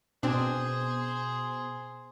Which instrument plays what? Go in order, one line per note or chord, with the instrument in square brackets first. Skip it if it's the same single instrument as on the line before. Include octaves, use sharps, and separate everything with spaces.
[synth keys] B2 [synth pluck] C4 D4 [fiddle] G#4 C5